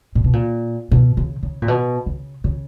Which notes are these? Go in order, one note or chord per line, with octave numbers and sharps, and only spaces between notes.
A#2
B2
A#2
B2
C#3
C#3
A#2
B2
C#3
C#3